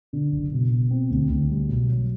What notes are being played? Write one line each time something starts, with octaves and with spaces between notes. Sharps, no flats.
D3
F#1
B2
B2
C4
D2
D2
G3
B1
F#3